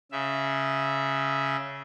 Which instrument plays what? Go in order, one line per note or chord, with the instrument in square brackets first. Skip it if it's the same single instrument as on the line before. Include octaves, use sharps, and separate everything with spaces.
[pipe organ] C#3 E5